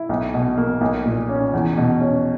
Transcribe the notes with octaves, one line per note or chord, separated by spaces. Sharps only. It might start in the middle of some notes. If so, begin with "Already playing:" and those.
Already playing: E4
B1
B2
A#3
B1
A#2
C#4
E2
B2
C#4